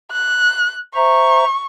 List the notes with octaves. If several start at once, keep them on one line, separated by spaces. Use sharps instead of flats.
F#6
C5 E5 A#5 C#6